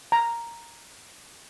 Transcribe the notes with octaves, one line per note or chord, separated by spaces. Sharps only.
A#5